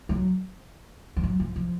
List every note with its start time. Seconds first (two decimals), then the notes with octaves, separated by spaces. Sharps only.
0.09 F#3
1.17 F3
1.24 F#3
1.40 F3
1.56 F3